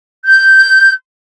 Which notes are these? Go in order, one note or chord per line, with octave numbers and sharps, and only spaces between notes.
G6